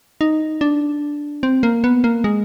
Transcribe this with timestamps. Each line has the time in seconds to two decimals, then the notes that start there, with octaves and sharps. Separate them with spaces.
0.21 D#4
0.61 D4
1.43 C4
1.63 A#3
1.84 B3
2.04 A#3
2.24 G#3